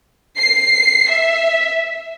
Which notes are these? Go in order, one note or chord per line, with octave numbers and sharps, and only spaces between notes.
C7
E5